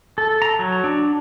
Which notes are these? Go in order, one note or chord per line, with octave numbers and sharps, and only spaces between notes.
A4
A#5
F#3
D4